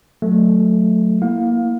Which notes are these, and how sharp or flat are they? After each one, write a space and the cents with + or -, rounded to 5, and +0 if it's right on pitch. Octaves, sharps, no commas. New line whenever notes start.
F#3 -20 A3 -5
A#3 +10 E4 +0 F5 +25